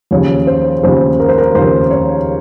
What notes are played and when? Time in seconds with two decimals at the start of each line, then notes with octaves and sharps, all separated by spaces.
0.11 D#2 C#3 F3 C#5
0.47 C5
0.83 D#2 C#3 F3 C5
1.20 A#4
1.28 C5
1.38 A#4
1.55 D#2 C#3 F3 C5
1.91 C#5